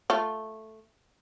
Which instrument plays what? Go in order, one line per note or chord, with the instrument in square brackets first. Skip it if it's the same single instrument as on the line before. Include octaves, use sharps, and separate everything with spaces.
[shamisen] A3 F4